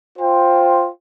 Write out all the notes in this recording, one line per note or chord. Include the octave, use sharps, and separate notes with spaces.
F4 C5 G5